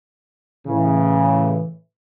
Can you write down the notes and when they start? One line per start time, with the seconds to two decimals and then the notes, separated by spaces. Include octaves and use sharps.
0.67 A2 C#3 E3